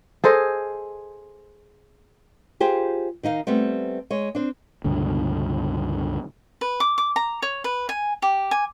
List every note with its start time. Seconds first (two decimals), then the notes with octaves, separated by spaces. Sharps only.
0.24 G#4 A4 C5 D#5
2.60 F4 G4 G#4 C5
3.23 D#3 D#4 D#5 F5
3.47 G3 A3 B3 C4
4.10 G#3 C#5
4.35 C4 D4
4.84 C#2 G2 B2 D3
6.61 B4
6.80 D6
6.98 D6
7.16 A#5
7.42 C#5
7.64 B4
7.89 G#5
8.22 G4
8.51 G#5